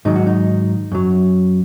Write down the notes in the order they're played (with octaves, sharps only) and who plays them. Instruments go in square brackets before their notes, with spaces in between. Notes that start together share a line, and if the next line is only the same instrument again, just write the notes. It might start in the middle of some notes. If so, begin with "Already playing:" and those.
[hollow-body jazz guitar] G#2 D#3 F#3 D#4
F#4
D#4
F#2 F#3